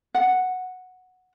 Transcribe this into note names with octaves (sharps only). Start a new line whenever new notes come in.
F#5